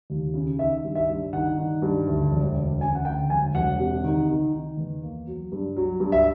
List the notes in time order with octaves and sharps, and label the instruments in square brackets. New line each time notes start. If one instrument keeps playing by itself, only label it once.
[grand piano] D#2
C#3
D#3 E5
G2
E5
G2
D#3 F#5
D#3
G2
D2
E1
D2
C#3 G#5
F#5
D2 G5
E1 G#5
E1 F#5
C3
D#3
D#3
D#3
E2
A#3
F#3
G2
F#3
G2
E5